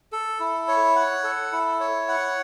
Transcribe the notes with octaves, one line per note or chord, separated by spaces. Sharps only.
A4
E4
C#5
F#5
A4
E4
C#5
F#5